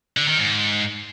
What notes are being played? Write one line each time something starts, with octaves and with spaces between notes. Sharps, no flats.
D3
D#3
G#2